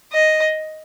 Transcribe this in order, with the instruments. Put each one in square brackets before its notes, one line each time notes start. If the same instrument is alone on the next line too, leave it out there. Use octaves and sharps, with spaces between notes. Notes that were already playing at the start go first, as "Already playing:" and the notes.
[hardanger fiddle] D#5